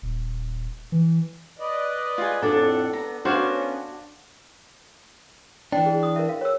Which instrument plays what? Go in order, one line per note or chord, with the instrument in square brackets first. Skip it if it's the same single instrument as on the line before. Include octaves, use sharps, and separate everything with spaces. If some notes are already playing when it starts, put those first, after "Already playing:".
[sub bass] D#1
E3
[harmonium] B4 D5 D#5
[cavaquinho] F4 G#4
[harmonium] F2 A2 F#5 [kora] D4 A4
[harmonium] B3 [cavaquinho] A#5
[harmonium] B3 C#4 [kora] D4 C5 C#5 [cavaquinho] F#4 F5
[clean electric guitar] E3 D4 [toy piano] G5
[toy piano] G#4
D#6
A#4 E5
F5
C#5 E6